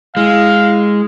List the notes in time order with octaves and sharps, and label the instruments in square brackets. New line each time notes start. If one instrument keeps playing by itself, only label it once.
[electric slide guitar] G#3 [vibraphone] E4 [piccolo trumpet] F5